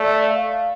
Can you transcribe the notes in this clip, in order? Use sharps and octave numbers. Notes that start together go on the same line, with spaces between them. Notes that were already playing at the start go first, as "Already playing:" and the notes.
Already playing: A3 D5
F5